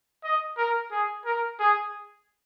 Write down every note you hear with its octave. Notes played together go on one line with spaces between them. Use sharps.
D#5
A#4
G#4
A#4
G#4